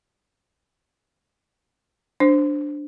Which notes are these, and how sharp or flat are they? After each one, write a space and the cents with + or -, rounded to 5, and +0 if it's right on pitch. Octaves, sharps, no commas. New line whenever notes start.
D4 +0 C5 +0